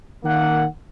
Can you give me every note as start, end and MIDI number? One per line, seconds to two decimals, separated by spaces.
0.24 0.65 51
0.24 0.65 58
0.24 0.65 78